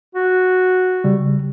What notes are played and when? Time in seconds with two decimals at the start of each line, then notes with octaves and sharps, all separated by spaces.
0.15 F#4
1.04 C#3 G3